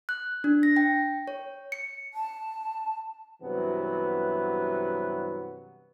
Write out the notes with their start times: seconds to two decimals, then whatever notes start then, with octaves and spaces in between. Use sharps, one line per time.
0.09 F#6
0.44 D4
0.63 A#6
0.77 G5
1.28 C#5
1.72 C#7
2.14 A5
3.43 G2 C3 E3 F#3 B3